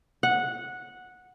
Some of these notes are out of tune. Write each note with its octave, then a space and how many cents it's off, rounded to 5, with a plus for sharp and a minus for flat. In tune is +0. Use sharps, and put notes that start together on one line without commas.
F#5 -10